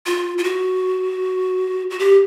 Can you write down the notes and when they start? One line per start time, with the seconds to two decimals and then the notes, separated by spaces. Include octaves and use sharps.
0.06 F4
0.38 F4
0.44 F#4
1.90 F#4
1.99 G4